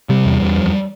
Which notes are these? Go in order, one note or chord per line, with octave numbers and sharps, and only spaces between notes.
C3 G3
E2
E2
F2